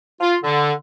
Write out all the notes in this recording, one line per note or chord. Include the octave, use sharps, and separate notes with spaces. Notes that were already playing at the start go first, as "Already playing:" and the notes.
F4
D3